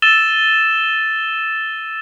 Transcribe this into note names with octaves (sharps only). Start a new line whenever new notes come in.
E6 A6 D#7 E7 G7